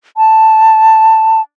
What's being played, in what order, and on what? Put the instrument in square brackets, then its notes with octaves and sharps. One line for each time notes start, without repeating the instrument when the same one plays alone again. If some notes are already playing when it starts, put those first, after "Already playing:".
[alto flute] A5